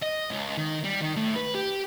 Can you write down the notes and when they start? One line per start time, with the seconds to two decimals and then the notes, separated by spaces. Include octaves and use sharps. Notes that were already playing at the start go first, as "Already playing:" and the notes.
0.02 D#5
0.31 C#2
0.57 D#3
0.84 G3
1.01 D#3
1.17 A2
1.36 B4
1.55 G4